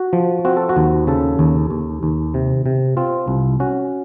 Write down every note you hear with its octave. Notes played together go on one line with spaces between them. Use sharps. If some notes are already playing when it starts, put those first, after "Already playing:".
Already playing: F#4
F3
C4 F#4
A4
F#4
D#2
C#3 A4
D#2
D#2
D#2
C3
C3
C4 F4
C2
C#4 F#4